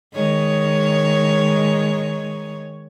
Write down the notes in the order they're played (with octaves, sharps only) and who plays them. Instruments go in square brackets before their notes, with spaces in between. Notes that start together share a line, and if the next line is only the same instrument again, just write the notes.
[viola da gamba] D#3 G#3 C#5